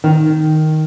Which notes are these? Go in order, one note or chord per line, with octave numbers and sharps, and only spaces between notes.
D#3